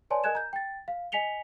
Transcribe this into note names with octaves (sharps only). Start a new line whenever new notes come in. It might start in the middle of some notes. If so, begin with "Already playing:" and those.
B4 C#5 D5 G#5 A5 C6
A#4 D#5 G#5 F#6 G#6 E7
A#5 G6
G5 A6
F5
D#5 G#5 B6 C#7 F7 G7